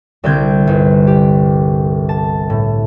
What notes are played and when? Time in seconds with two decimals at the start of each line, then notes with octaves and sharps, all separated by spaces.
0.24 C2 D3 G3 C4 G6 G#6
0.67 G1
1.07 G4
2.09 A5
2.50 A2